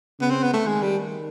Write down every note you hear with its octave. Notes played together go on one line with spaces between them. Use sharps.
C#3 B3
C4
B3
A3
D#3 G#3
G3